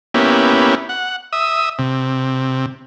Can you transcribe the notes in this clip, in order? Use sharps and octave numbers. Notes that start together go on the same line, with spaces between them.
A#3 B3 C#4 E4 G4
F#5
E5 D#6
C3